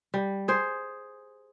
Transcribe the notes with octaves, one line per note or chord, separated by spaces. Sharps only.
G3
G#4 C5